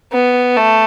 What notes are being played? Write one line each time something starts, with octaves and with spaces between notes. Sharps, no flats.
B3
A3